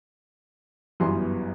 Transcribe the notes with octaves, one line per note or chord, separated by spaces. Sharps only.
G1 F#2 E3 G3 B3 C6